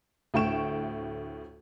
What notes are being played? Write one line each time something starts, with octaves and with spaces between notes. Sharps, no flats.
D2 A2 G5 C#6 E7